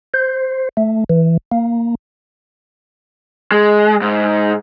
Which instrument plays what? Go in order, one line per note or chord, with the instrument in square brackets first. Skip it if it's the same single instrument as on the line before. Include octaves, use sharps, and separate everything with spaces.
[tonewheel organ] C5
A3
E3
A#3
[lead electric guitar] G#3
G#2